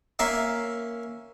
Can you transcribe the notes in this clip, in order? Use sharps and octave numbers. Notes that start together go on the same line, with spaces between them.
A#3 C#4 A#4 E5 F5